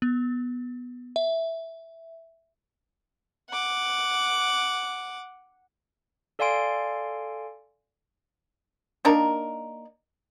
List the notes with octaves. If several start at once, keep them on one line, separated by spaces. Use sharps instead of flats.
B3
E5
F#5 D6
A4 D5 F5 G#5 C6 D7
A#3 D4 D#4 A#4